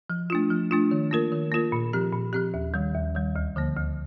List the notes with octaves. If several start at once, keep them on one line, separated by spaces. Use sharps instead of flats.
F3
A3 D4 F4
F3
A3 D4 F4
D#3
A#3 F4 A#4
D#3
A#3 F4 A#4
A#2
F3 C4 G4
A#2
F3 C4 G4
D#2
D#3 G3
D#2
D#3 G3
D2
D3 F3 A#3
D2